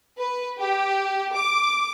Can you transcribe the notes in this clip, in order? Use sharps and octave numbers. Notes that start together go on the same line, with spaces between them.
B4
G4
D6